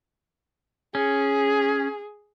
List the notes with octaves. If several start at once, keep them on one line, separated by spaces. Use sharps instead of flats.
C#4 G#4